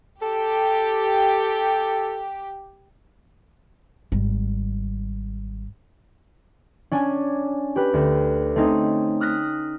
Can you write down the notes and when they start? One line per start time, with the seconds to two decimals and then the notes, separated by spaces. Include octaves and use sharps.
0.22 G4 A4
4.12 G#1 G3
6.92 C#4 D4 G#5
7.76 G4 B4
7.94 D2
8.56 A3 C4 C#4 D#4
9.20 D#6 F6 F#6 A#6 B6